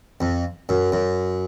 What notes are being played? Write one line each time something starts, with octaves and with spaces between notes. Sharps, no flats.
F2
F#2
F#2